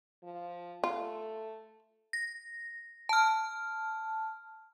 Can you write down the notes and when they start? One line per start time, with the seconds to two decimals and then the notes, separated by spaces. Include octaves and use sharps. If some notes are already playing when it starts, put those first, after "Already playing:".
0.24 F3
0.84 A3 F4
2.13 A#6
3.09 A5 F6